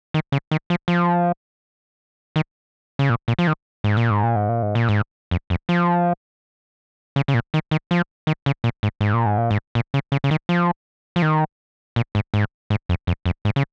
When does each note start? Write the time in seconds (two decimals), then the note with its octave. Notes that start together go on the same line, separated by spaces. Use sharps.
0.14 D#3
0.32 C#3
0.51 D#3
0.70 F3
0.88 F3
2.36 D#3
2.99 C#3
3.10 A#2
3.28 A#2
3.39 F3
3.47 D#3
3.84 G#2
3.97 A#2
4.10 G#2
4.23 A#2
4.36 G#2
4.49 A#2
4.62 G#2
4.75 A#2
4.89 G#2
5.31 F2
5.50 F2
5.69 F3
7.16 C#3
7.28 C#3
7.34 A#2
7.54 D#3
7.71 D#3
7.91 F3
8.27 D#3
8.46 C#3
8.64 A#2
8.83 G#2
9.01 G#2
9.14 A#2
9.26 G#2
9.38 A#2
9.51 G#2
9.75 A#2
9.94 C#3
10.12 C#3
10.24 C#3
10.31 D#3
10.49 F3
11.16 F3
11.22 D#3
11.96 A#2
12.15 G#2
12.34 G#2
12.70 G#2
12.89 F2
13.07 F2
13.26 F2
13.45 G#2
13.56 C#3